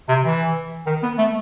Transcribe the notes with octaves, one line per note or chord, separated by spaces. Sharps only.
C3
E3
D#3
B3
A3